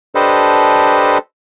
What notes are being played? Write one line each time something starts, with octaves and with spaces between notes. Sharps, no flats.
D4 G4 A4 B4 C5 D#5